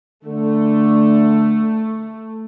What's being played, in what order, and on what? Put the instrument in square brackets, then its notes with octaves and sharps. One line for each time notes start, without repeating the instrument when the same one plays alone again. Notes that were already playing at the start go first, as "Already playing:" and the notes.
[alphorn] D3 [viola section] A3